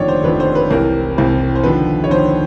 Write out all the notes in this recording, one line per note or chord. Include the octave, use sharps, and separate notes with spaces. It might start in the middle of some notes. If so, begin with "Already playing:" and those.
Already playing: F1 D#2 D3 F3 C#5 D5
C5
F1 D#2 D3 F3 B4
C5
B4
C2 C3 E3 A#4
C2 C3 E3
C5
D#2 D3 F3 B4
C#5
D#2 D3 F3 C5